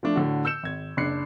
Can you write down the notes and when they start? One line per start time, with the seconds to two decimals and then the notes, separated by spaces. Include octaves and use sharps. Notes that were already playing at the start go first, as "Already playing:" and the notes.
0.03 F3 A3 D4
0.16 A2 D3 F#4
0.45 E6 G6 C#7 E7
0.63 G#1 G#6
0.97 F#1 D4 F#6 C7 C#7